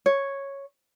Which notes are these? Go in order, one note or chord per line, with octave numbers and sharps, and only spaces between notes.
C#5